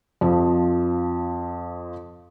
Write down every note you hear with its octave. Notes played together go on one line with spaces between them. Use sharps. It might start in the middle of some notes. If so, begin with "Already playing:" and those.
F2 F3